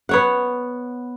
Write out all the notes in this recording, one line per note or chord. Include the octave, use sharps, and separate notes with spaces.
B3 C#5 F#5